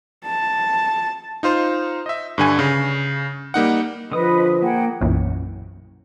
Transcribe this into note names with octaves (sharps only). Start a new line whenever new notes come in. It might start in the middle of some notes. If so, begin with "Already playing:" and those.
A5
D#4 F4 C5
D#5 E5
G2 D3 G#5
C#3
G3 A#3 D#4 F#5
D3 F3 B4 D#5 D#6
A#3 G#4 F#5 G5
B1 F#2 A#2 E3